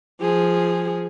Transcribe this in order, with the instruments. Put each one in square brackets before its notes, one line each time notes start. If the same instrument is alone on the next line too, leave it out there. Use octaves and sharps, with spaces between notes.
[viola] F3 G#4